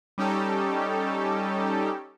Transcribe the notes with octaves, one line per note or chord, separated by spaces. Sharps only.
G3 C#4 D#4 G4 A4